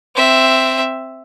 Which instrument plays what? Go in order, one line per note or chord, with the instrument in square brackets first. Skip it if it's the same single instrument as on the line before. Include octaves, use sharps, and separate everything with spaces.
[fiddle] C4 E5